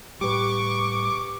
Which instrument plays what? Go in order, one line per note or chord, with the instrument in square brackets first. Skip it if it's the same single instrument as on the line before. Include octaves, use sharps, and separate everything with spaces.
[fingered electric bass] A2 G3 [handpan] G4 B4 [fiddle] C#6 [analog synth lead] D6